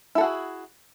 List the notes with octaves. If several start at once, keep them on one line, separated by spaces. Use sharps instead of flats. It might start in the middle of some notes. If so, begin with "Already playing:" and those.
E4 F#4 G#4 A4